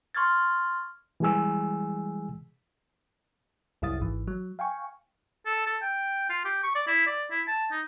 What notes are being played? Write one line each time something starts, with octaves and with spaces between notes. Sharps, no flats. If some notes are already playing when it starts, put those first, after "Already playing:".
C6 C#6 F6 G#6 A6
E3 G3 G#3 G#4 G#5 E6
C2 F#2 E4 F5 D#6 A6
G#1 E3
F#3
F5 G5 G#5 C#6
A4
A4
G5
F4
G4
C#6
D5
E4
D5
E4
A5
D#4